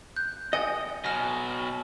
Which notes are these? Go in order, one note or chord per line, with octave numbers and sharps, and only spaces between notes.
F#6 G6
D#5 G5 G#5 C#7
B2 F#3 G#5 F6 A#6